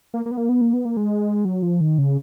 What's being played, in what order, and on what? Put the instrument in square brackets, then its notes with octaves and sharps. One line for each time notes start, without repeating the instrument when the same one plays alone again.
[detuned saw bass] A#3
A#3
B3
A#3
B3
A#3
B3
A#3
G#3
F#3
F3
D#3
C#3